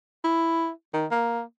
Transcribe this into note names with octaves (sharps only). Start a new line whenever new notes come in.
E4
D#3
A#3